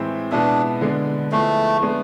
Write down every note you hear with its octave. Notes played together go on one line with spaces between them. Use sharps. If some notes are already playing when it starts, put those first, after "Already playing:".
Already playing: A2 E3 G#3 C4 E4
B2 G#3 B3 D4 E4
D3 G#3 B3 D4
F3 G#3 A3 B3 E4
G#3 B3 D4